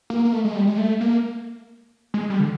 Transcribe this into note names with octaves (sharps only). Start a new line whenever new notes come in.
A#3
A#3
A3
G#3
G3
G#3
A3
A#3
G#3
G3
D3